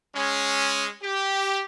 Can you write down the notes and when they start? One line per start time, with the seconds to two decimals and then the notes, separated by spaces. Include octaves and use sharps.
0.15 G#3 C#4
1.01 G4